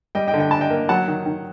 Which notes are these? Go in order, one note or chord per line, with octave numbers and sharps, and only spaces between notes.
G3 D#5 G5
D#5 G5
D3
G5
D4 A5
D#5 G5
A#3
F#3 F#5 A5
D#3
D#3